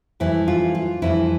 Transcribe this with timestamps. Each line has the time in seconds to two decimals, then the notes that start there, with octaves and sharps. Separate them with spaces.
0.20 F2 E3 G3 E4
0.48 F4
0.75 F4
1.02 F2 E3 G3 E4